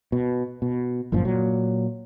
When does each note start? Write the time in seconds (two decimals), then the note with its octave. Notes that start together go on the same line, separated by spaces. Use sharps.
0.12 B2
0.62 B2
1.12 G1 F#2 A#2 F3
1.25 A#2 F#3